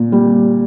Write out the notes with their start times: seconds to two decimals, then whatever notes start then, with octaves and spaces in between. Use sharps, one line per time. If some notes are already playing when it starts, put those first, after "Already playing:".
Already playing: A#2
0.12 G3